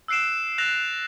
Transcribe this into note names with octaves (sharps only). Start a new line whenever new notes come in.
E6 F#6 C7 D7 E7
E6 F#6 A6 A#6 E7 F7